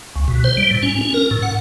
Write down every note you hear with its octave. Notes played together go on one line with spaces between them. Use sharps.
C#2
B2
C5
G3
A2
C#4
C#4
A#4
A2
F#5